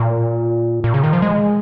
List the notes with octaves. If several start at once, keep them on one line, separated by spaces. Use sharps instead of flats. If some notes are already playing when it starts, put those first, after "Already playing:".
Already playing: A#2
A#2
C#3
D#3
F3
G#3